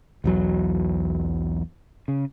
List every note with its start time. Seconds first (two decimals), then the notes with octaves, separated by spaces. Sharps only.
0.24 B1 E2 F#3
2.08 C#3